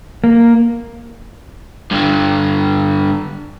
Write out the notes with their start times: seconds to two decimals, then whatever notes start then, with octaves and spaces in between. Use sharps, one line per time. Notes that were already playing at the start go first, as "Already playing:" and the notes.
0.24 A#3
1.91 G2 D3